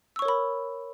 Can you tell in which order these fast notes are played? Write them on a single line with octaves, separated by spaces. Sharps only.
E6 C#6 C#5 A#4 B5